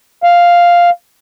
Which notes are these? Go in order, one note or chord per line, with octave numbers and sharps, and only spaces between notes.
F5